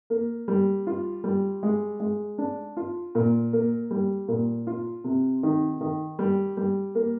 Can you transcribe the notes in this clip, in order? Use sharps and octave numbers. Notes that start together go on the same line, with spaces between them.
A#3
G3
F4
G3
G#3
G#3
D4
F4
A#2
A#3
G3
A#2
F4
C3
D#3
D#3
G3
G3
A#3